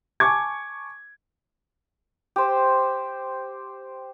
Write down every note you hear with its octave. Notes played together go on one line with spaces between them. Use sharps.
G#5 A5 C#6 D6 G#6
G4 C5